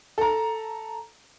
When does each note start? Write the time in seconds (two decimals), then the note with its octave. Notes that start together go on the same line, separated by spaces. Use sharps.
0.18 A4 A#5